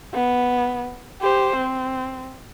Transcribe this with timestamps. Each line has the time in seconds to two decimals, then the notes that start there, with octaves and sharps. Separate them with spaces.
0.14 B3
1.21 G4 C5
1.57 C4